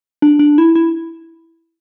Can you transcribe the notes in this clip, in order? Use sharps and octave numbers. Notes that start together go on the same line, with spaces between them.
D4
D4
E4
E4